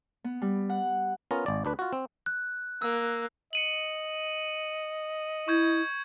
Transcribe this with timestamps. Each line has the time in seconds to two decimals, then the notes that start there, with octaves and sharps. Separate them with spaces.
0.24 B3
0.42 G3
0.69 F#5
1.31 B3 C#4 F4 A#4
1.46 G#1 D5
1.65 D2 D4 B4
1.79 F4 F#4
1.93 C4
2.26 F#6
2.82 A#3 E6 F#6
3.53 D#5 C#7 D#7 F#7
5.48 E4 C#6 G6 G#6